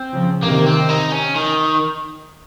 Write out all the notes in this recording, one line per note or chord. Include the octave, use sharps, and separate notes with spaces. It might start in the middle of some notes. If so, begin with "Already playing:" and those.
Already playing: C4
C#3 F3
C3 D#3 A#3
C4
D#4
C#4
D#3